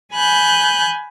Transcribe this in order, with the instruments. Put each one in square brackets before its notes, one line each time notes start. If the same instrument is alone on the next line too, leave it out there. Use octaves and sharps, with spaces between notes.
[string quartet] G#5 B5 F#6 G6